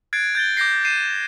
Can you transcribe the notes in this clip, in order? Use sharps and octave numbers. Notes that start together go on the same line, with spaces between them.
F#6 G#6 A6 C7 D7
G6 A6 G7
D6 G6 A#6 C7
C7 D#7 E7